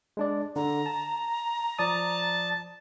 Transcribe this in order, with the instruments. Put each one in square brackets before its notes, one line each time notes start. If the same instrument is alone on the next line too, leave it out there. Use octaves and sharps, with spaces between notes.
[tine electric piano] G#3 D4 D5
[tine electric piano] D3 [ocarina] A#5
[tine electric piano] A5
[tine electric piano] F3 D5 D#6 [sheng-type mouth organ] A5